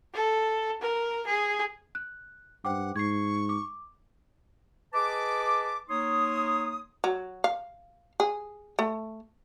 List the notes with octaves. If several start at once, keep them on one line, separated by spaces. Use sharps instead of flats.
A4
A#4
G#4
F#6
G2 C5 F#5 G5 D6
G#2 C#6 G#6 C7
D6
G#4 B4 D#5 A5 D6
A#3 D#4 C#5 C6 D#6
F#3
F5
G#4
A3